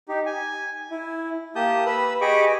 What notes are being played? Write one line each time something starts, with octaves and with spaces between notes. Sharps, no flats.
D#4 G4
G#5
E4
A#3 G4 A5 D#6 G6
B4 B5 E6
G4 G#4 D#5 B5 C#6 D6